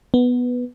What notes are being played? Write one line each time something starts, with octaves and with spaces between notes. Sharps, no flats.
B3